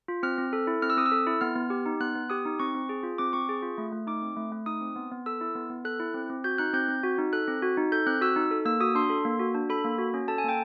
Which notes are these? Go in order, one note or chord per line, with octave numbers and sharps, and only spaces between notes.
F4
C4 F6
C4
A4
E4
C4 F6
E6
C4 D#6
E6
A4
E4
B3 F6
B3
G4
D#4
B3 F#6
B3
G4 D#6
D#4
C4 C#6
C4
G#4
F4
C4 D6
C4 C#6
G#4
F4
A3
A3
D#4 D6
C4
A3
A3
D#4 D#6
C4
B3
B3
A4 E6
E4
B3
B3
A4 F#6
E4
C4
C4
F#4 G6
D#4 F#6
C4 G6
C4
F#4
D#4
A4 F#6
C4
F#4
D#4
A4 G6
C4 F#6
F#4 E6
D#4
A4
A#3 E6
F#4 D#6
D4 C6
A4
A#3
F#4
D4
A4 B5
A#3
F#4
C#4
A4 A5
G#5
A#3 G5